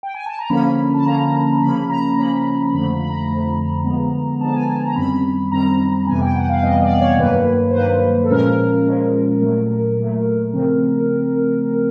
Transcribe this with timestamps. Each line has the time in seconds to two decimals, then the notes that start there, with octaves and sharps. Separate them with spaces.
0.03 G5
0.14 G#5
0.26 A5
0.39 A#5
0.50 D3 F3 A#3 C#4 B5
0.94 A5
1.05 D3 F3 A#3 C#4 A#5
1.61 C#3 F3 A#3 C#4 B5
1.90 A#5
2.17 C#3 F3 A#3 C#4 B5
2.73 F2 D3 F3 A3 B5
2.91 B5
3.05 B5
3.10 A#5
3.29 F2 D3 F3 A3
3.84 D3 F3 G#3 B3
4.40 D3 F3 G#3 B3 A5
4.53 G#5
4.66 A5
4.85 A#5
4.96 F#2 D#3 G3 C4 B5
5.52 F#2 D#3 G3 C4 A#5
6.07 F2 C3 E3 G3 B3 G#5
6.21 G5
6.36 F#5
6.49 F5
6.63 F2 C3 E3 G3 B3 D#5
6.82 D5
6.95 D5
7.01 C#5
7.19 G2 D#3 F#3 A#3 B4
7.70 C5
7.75 G2 D#3 F#3 A#3 B4
8.24 A4
8.30 A#2 F3 G#3 C#4 A#4
8.86 A#2 F3 G#3 C#4
9.42 A#2 F#3 A3
9.98 A#2 F#3 A3
10.53 C#3 F3 A3 C4